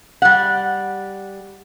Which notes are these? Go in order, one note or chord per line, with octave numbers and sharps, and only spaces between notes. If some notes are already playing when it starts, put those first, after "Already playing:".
G3 F#5